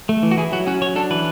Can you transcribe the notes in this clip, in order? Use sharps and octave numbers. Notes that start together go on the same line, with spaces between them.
A3
E3
F#4
E4 G#4
F#3 F#4
C#4 F#4
F#3 C#5
D4 A4
E3 B4